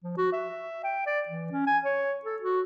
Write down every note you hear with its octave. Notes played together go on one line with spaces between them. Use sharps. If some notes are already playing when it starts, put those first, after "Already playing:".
F3
F#4
E5
G5
D5
E3
C#4
G#5
C#5
A4
F#4